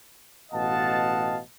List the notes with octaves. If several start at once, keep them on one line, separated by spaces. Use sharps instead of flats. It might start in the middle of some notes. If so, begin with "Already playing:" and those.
A1 B2 D#5 F5 F#5 A5